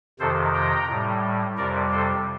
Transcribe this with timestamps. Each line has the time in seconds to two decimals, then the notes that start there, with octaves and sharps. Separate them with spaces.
0.20 F2 C3 D#3 A4 C5
0.54 G5 A#5
0.89 A2 G3
1.57 F2 C3 G3 A#4 D5
1.92 A4 C5